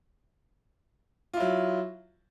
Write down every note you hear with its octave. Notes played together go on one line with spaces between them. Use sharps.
F#3 E4 F4